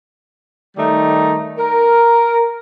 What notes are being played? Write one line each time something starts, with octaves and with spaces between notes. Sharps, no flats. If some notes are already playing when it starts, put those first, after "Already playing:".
D#3 G3 A3 D#4
A#4